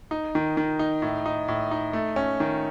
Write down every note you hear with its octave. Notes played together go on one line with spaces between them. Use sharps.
D#4
D#3
D#3
D#4
A2
D#4
A2
D#4
A3
C#4
D#3